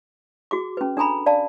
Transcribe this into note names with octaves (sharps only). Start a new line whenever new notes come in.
F#4 G#4 D6
C#4 B4
D4 A4 G#5 A#5 B5
D5 F5 A5